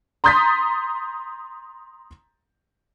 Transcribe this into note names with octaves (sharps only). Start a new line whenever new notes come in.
A#5 C6 D#6 G6 A6 B6